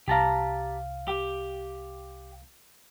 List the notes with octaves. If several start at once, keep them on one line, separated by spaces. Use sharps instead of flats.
C2 G4 F5 A5 A#5
G4